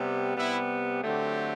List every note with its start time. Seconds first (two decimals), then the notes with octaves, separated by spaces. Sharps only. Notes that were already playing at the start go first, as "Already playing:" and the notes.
Already playing: C3 G3 B3
0.36 C3 G3 B3 E4
1.02 D3 F#3 A3 C4 G4